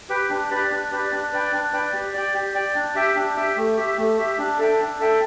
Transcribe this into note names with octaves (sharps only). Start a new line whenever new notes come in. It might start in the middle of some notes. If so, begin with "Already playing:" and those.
G4 B4 G5
D4
G4 B4 D5
D4
G4 B4 D5
D4
B4 D5 G5
D4
B4 D5 G5
G4
D5 G5
G4
D5 G5
D4
G4 E5 G5
D4
G4 E5 G5
A3
G4 E5
A3
G4 E5
D4
A4 E5 G5
D4
A4 E5 G5